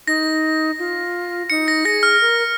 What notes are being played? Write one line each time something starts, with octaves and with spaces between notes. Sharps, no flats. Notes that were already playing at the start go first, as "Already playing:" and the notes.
D#4 A#6
F4
D#4 C#7
A#6
G#4 A#6
F6
A#4